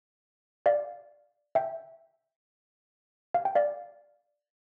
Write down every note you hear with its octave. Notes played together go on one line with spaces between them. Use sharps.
D5 F5
E5 G5
F5
G5
D5 F5